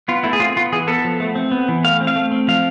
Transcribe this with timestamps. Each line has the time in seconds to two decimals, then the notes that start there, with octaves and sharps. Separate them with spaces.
0.08 B3 F4
0.24 A3 E4
0.33 G#4
0.39 C4 F4
0.56 B3 F4
0.72 E3 G#4
0.87 B3 A4
1.04 F3
1.20 A3
1.35 C4
1.51 B3
1.68 E3
1.84 A3 F5
2.00 C4
2.07 F5
2.16 A3
2.31 C4
2.48 F3 F5